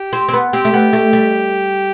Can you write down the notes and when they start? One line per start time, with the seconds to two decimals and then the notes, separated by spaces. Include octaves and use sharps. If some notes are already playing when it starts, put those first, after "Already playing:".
Already playing: G4
0.13 C4
0.29 C4
0.33 B3
0.53 C4 G4
0.65 A3
0.74 B3
0.93 A3
1.13 G3